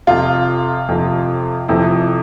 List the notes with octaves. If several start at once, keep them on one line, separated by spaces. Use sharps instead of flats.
F2 C3 F3 F4
F2 C3 F3
F2 C3 F3 E4